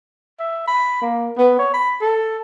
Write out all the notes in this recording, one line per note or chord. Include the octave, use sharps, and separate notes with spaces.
E5
B5
A#3
B3
C#5
B5
A4